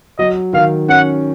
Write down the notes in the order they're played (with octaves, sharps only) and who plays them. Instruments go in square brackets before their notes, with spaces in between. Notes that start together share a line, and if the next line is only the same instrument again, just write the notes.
[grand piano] F#3 [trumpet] D#5
[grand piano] D#3 [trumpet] F5
[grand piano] C#4 [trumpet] F#5